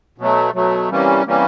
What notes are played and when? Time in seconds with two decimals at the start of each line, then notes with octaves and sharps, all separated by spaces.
0.18 B2 F#3 A3
0.54 B2 F#3 A3
0.90 C3 E3 G3 A#3 C#4
1.24 C3 E3 G3 A#3 C#4